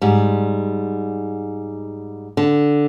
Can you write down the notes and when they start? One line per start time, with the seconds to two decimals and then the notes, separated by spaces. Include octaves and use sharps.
0.02 G#2 G3
2.37 D3